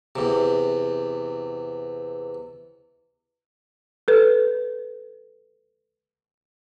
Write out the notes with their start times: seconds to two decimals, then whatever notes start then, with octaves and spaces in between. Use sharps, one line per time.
0.16 E2 C3
4.08 A4 B4